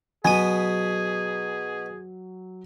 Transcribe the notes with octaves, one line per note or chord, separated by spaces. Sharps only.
B2 F#3 B3 G#4 G#5 D#7